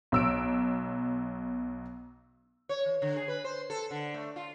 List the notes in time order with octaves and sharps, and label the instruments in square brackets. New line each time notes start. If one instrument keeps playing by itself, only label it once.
[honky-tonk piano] B1 E6 D7
[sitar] C#5
E3
D3
G#4
B4
C5
A4
D3
A3
F4